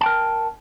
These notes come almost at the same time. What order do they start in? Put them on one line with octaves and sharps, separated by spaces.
A5 G5 A#4